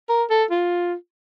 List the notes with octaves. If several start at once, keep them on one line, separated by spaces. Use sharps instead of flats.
A#4
A4
F4